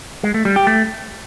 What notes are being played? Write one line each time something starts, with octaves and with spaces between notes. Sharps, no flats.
G#3
A3
G3
G4
A3